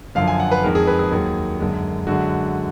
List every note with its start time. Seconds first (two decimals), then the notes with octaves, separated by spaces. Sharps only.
0.15 F#2 D3 F3 F5
0.27 G#5
0.40 F#5
0.51 B4
0.63 F2 D#3 G#3 A#4
0.75 G#4
0.87 B4
0.99 G#4
1.12 D#2 D#3 F#3
1.59 F#2 D3 G#3
2.07 F#2 D3 G#3 F#4